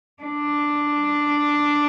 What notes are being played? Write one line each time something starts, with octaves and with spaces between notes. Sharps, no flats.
D4